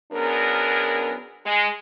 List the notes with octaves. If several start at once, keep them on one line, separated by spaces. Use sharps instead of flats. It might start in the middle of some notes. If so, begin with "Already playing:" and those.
F#2 B3 D4 G#4 A#4
G#3